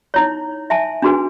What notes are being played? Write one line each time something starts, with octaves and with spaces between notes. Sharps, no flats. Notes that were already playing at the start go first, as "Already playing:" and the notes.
D#4 E4 C#5
E5 G#5 A5
D4 D#4 F#4 G#4 B4 G#5